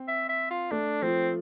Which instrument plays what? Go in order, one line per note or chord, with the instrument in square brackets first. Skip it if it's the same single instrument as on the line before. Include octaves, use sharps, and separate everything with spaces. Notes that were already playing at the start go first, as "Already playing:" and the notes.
Already playing: [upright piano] C4
[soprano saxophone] E5
E5
F4
[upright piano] A3 [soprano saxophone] D4
[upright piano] F3 [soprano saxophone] C4